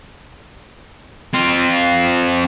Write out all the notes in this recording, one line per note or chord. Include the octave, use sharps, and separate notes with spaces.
C4 F4